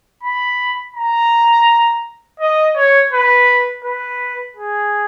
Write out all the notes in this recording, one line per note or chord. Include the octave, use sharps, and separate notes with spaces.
B5
A#5
D#5
C#5
B4
B4
G#4